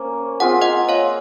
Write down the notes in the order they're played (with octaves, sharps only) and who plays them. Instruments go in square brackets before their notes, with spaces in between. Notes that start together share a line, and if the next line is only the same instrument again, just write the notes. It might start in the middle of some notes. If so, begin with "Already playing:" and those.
Already playing: [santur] A#3 C#4 [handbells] C5
[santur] C4 F4 G#4 [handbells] F#5
[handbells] D#5 F#5
C#5 F5